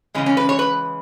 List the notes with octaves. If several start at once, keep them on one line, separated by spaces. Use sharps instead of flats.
C#3 E3 G#3 C#4
C#4
B4
C#5
B4